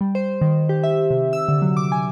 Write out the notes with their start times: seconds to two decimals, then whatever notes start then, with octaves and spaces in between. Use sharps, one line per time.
0.01 G3
0.15 C5
0.41 D#3
0.69 G4
0.83 E5
1.10 C3
1.33 E6
1.48 D3
1.62 F#3
1.77 D6
1.92 G#5